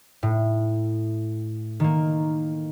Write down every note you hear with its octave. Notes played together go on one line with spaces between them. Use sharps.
A2
D#3 A#3